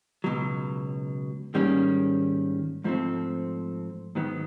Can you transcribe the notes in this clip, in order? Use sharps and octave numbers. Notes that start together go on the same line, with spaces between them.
C#2 B2 F#3
G#2 D#3 G3 A#3 C#4
G#2 F3 A3 C4
G#2 D#3 F#3 B3